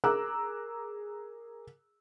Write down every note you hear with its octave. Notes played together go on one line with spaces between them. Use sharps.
G#4 A#4 A#5 D6 E6 F#6